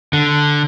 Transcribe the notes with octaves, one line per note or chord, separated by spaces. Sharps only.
D3